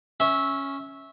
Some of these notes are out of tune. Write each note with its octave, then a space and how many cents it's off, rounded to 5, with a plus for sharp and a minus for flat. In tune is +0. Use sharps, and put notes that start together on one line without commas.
C#4 -5 E5 -15